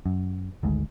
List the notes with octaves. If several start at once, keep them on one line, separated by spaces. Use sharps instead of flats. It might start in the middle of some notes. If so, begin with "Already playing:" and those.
F#2
G#1 D2 G#2